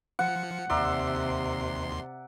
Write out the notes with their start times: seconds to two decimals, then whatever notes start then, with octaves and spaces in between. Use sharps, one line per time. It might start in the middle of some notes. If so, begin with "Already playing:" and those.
0.19 F3 F#5 C#7
0.70 D#2 C3 D5 E5 A#5 C6